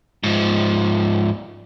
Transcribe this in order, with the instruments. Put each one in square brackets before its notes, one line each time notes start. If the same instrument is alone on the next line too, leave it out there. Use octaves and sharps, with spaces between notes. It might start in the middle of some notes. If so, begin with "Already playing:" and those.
[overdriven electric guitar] G#2 F3